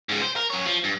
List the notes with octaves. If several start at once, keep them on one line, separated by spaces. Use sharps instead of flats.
G#2 C#3
C5
A#4
F#2 C#5
F3
G2